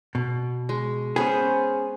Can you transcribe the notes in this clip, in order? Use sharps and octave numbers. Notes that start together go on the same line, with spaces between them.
B2
G#3
B3 C#4 G#4 C5